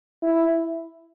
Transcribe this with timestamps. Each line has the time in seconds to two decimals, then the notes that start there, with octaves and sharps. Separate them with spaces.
0.23 E4